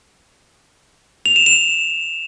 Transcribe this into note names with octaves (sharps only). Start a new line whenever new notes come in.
F7
E7
E7